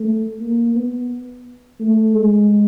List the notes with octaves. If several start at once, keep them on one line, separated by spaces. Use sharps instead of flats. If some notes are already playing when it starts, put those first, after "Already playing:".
Already playing: A3
A#3
B3
A3
G#3